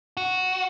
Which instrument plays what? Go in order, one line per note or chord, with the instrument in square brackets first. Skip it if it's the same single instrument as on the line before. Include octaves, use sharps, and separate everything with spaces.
[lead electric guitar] F#4